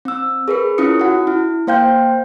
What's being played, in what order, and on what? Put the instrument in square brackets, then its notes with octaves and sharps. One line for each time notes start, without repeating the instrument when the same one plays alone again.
[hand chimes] C4 E6
G#4 A#4 B4
C#4 E4 F4 D#6 C#7
F#4 F#5
E4
A#3 C5 F5 G5 G6